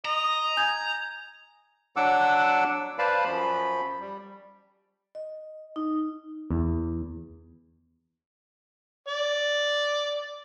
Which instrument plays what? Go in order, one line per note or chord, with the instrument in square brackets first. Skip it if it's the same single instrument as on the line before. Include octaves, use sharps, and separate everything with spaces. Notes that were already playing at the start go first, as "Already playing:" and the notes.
[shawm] D#5 [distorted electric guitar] A#5
[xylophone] G#5 G6 G#6
[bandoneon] F#3 D4 F#5 D6 E6
B4 C5 D5 F5 A5 B5
F#2 F3 B5
G3
[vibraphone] D#5
D#4
[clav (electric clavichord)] E2
[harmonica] D5